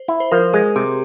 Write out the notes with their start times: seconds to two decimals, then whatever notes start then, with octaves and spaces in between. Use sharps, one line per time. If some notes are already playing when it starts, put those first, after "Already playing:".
Already playing: C5
0.08 E4
0.20 C5
0.31 F3 A#4
0.53 G#3 G#4
0.76 C3 G4